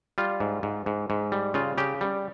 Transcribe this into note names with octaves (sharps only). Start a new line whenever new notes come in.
G3 F4
G#2
G#2
G#2
G#2
G3
C#3 F4
C#3 G4
G3